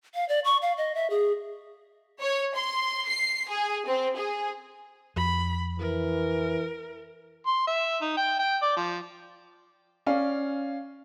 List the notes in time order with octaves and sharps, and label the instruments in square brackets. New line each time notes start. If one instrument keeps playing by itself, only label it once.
[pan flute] F5
D5
C#6
F5
D#5
E5
G#4
[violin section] C#5
C6
C7
G#4
C4
G#4
[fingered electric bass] F2 [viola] B5
[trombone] E3 [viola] A#4
[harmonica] C6
E5
D#4
G5
G5
D5
F3
[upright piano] C#4 D5 F5